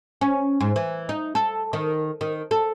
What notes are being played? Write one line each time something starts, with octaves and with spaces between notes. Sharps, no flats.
C#4
G#2
E3
D#4
A4
D#3
D#3
A4